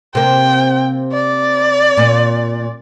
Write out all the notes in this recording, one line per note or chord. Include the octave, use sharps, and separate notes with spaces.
C3 A#3 G5
D5
A#2